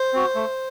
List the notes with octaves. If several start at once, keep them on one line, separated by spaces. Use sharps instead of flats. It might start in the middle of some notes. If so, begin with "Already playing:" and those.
Already playing: C5
C4 F#4
A3